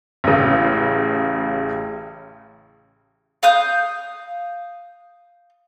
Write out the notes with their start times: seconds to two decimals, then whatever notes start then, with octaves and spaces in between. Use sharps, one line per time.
0.24 A1 C#3
3.43 F5 D#6 G6